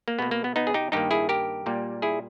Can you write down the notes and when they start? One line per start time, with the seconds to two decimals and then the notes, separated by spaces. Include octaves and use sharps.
0.08 A#3
0.19 B2 A#3 B3
0.31 A#3
0.44 B3
0.56 B3 D#4
0.67 G#4
0.74 D#4 G4
0.92 G2 D#3 A#3 D#4 G4
1.11 E4 G#4
1.29 G4 A#4
1.66 A#2 G3 A#3
2.02 E4 G#4